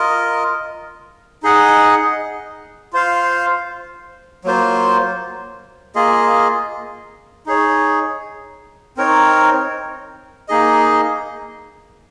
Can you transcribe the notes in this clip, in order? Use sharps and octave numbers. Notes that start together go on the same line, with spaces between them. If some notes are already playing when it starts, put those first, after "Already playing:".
Already playing: F4 A#4 D#5
D#4 G#4 D#5 F#5
F4 C5 F5
F#3 A#3 F4 C5
A#3 F4 G#4 D#5
D#4 G#4 C#5
C4 D#4 A#4 C#5
A#3 D#4 G#4 D#5